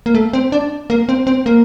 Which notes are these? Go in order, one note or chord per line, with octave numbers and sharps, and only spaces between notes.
A#3
A3
C4
D4
A#3
C4
C4
A#3